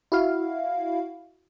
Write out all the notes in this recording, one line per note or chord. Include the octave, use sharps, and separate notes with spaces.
E4 F#4 F5